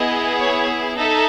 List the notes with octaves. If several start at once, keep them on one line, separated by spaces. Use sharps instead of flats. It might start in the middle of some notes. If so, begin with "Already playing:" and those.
Already playing: B3 E4 G#4 D#5
C#5
D#4 A4 E5